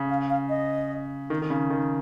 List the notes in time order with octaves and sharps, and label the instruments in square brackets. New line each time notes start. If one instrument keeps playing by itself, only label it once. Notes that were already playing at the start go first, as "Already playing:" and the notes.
Already playing: [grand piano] C#3
[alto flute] F5
F5
D#5
[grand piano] D#3
D#3
C#3
D#3